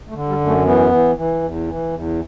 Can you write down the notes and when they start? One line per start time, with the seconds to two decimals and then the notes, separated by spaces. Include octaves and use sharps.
0.08 A3
0.14 D3
0.28 G3
0.41 F#2
0.47 A3
0.65 E3 B3
0.91 E3
1.17 E3
1.43 E2
1.68 E3
1.93 E2